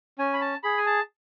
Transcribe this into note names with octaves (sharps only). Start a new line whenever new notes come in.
C#4 G#5
B5
A5
G#4 B5
G#5
A5